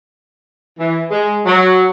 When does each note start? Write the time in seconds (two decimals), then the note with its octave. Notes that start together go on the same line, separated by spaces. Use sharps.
0.79 E3
1.11 G#3
1.46 F#3